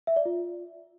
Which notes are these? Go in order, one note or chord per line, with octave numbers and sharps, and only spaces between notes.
E5
D5
F4